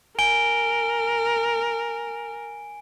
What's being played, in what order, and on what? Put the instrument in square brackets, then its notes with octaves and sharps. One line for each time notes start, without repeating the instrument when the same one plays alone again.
[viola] A#4 [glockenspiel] G#5 D7 G7